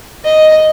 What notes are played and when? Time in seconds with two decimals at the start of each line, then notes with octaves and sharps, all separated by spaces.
0.24 D#5